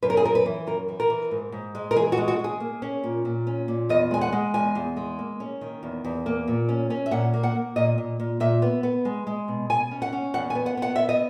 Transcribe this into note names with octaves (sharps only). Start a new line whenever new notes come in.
F#2 B4
A#4
G#4
F#2 A#4
B4
E3
F#2 A#4
E3
A#4
E3
G#2
G#2
G#3
A#4
E3 G#4
F#4
G#3
F#4
G#3
G#4
A#3
C#4
A#2
A#2
C#4
A#2
E2 D#5
G#3 G#5
F#5
G#3
E2 G#5
E2
G#3
A#3
C#4
D#3
E2
E2
A#3
A#2
C#4
C#4
E5
A#2 F#5
A#3
F#5
A#3
A#2 D#5
A#2
A#2
A#2 E5
B3
B3
G#3
G#3
B2
B2 G#5
C#4
F#5
C#4
E2 F#5
G#5
B3
F#5
B3 F#5
B3 E5
D#5